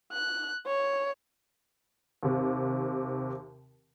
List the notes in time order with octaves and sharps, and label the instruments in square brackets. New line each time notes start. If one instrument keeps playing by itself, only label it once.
[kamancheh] F#6
C#5
[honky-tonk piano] D#2 C3